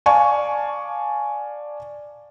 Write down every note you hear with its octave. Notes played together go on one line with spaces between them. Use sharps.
D5 F5 G#5 A5 C#6